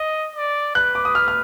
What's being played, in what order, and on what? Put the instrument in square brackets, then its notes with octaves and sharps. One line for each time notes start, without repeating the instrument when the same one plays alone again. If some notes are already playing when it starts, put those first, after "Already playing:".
Already playing: [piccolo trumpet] D#5
D5
[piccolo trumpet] B4 [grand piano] F#6
[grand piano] D6
D#6
F6
F6